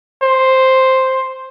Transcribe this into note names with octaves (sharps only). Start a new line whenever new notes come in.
C5